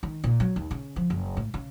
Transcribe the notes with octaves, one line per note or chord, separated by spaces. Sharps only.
D#3
A#2
F#3
D#2
C#3
F3
F#1
A2
C#3